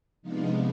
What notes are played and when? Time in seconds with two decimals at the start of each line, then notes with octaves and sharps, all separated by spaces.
0.22 C3 F3 G#3 B3 D4 D#4 F4